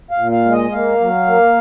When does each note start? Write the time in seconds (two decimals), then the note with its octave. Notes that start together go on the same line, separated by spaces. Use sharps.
0.11 F5
0.18 A#2
0.32 F5
0.45 G#3
0.52 D#5
0.72 A#3 F5
1.00 F#3
1.27 A#3